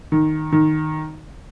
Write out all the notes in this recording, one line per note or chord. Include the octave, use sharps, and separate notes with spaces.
D#3
D#3